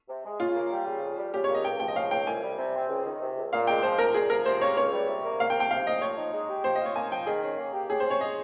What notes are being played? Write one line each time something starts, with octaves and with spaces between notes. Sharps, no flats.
C3
G#3
C#3 F4
A#3
G3
C#3
F2
G3
C#3 G4
C#5
A#3
D#5
C#2 G5
F3 G5
D#5
C#3 F5
C#2 G5
C2 G#5
G3
C3
C4
C#2
D#3
C3
C#2
A#2 F5
G#3 G5
F3 C5
A#2 A#4
C2 G#4
F3 A#4
C3 C5
A#3 C#5
C#2 C#5
G3
C3
A#3
C2 F5
G5
F3
G5
C3 F5
C2 D#5
F3 C#5
D#4
G#3
G4
F3 C5
F4 D#5
C#5
A#3 G#5
F3 G5
D#3 G#4
C#4
A#3
G4
C#3 G#4
C5
C#4
C#5
G#3 D#5